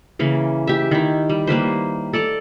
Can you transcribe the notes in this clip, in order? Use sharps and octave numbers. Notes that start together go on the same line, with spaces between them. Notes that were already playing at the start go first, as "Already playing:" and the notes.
C#3 E3 A#3
G4 E5
D#3 E4
G3
G3 A#3 B4 C5
A4 D5 A5 A#5